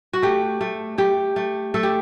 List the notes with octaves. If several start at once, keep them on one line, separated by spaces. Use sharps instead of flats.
F#4
A3 G4
A3
A3 G4
A3
A3 A4
G4